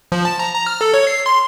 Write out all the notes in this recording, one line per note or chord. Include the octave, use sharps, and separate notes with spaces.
F3
A5
A#5
A#5
F6
A4
C#5
C7
C6